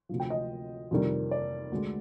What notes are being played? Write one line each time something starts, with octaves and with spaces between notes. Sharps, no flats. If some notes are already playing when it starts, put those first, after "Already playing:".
D2 C3 F3
G5
D#5
F2 C3 D#3 G3
D5
D2 D3 G#3